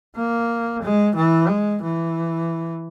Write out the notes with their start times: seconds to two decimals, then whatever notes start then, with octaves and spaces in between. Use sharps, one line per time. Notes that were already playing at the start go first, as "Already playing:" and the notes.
0.17 A#3
0.83 G#3
1.15 E3
1.48 G#3
1.82 E3